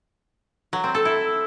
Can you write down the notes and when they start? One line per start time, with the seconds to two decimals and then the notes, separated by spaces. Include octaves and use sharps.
0.73 F#3
0.84 C4
0.95 A4
1.05 E4